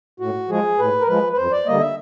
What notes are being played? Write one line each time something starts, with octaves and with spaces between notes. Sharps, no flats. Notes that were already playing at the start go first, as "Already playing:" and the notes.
A2 F#4
F3 G#3 G#4
A2 B4
A#4
F3 G#3 B4
B4
F2 C5
D5
D3 G3 A#3 D#5
E5